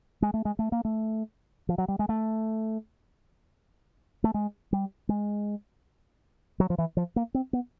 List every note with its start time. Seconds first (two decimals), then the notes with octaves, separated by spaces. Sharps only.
0.22 G#3
0.34 A3
0.45 G#3
0.59 A3
0.72 A#3
0.85 A3
1.69 F3
1.78 F#3
1.88 G3
1.99 G#3
2.09 A3
4.24 A3
4.34 G#3
4.73 G3
5.09 G#3
6.60 F#3
6.70 F3
6.78 E3
6.97 F3
7.16 A#3
7.35 C4
7.53 B3